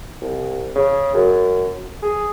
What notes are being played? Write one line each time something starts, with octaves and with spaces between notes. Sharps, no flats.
C2
C#3
F#2
G#4